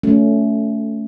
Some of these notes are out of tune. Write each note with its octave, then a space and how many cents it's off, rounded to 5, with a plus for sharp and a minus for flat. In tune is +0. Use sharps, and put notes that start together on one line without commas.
A3 +0 C#4 +25 F#4 -5